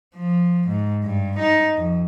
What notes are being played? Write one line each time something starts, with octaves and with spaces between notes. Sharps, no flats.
F3
G#2
G2
D#4
F2